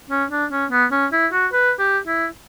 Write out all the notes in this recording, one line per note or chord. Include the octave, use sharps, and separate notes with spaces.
C#4
D4
C#4
B3
C#4
E4
F#4
B4
G4
E4